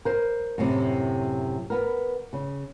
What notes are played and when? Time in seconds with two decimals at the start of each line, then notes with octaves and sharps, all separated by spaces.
0.05 A#4 C5
0.58 F#2 A2 C3
1.70 B3 A#4
2.33 C#3